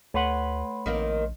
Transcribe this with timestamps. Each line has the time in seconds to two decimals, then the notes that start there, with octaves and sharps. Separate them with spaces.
0.14 D2 A3 B4 C#5 F#5 C6
0.86 A#1 D#3 A#3 C4